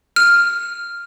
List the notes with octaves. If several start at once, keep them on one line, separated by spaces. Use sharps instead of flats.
F6